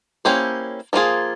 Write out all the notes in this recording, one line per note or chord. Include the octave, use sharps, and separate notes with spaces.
A#3 C#4 E4 G4 C5
F3 A#3 C#4 F4 G#4